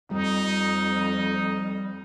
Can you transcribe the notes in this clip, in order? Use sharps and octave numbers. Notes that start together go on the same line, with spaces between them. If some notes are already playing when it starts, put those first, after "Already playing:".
F2 G3 D#4